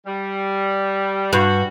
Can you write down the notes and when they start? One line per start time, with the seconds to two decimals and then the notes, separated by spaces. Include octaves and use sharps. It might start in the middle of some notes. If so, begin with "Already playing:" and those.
0.06 G3
1.33 G2 F#4